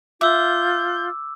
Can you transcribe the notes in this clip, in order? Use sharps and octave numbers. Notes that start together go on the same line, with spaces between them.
F4 E5 D6 E6 G6